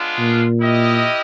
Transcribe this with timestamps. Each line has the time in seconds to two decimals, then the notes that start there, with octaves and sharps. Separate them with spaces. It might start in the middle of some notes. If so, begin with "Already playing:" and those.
Already playing: G#3 B3 D4 F4
0.19 A#2
0.61 E4 G4 A#4 D#5